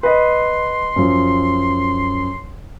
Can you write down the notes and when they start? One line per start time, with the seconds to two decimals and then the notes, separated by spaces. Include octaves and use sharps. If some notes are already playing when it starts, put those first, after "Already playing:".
0.03 B4 D#5 C6
0.96 F#2 F3